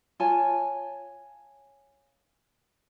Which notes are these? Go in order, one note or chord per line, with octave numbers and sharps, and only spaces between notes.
F4 C#5 G#5 A5